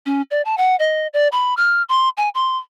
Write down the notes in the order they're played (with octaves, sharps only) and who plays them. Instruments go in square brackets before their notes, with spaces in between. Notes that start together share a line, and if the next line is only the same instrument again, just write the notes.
[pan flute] C#4
D5
A5
F#5
D#5
D5
B5
F6
C6
G#5
C6